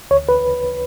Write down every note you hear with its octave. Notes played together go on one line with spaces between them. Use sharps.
D2 C#5
B4